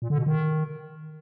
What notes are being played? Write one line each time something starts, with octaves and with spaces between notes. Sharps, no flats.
A#2
D3
B2
D#3